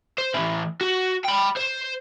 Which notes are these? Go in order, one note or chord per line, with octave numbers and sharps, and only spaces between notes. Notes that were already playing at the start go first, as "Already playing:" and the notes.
C5
A2 E3
F#4
G5 B5
C5